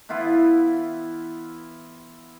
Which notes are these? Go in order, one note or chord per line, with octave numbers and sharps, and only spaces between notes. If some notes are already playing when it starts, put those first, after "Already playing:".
E3 B3 E4 F4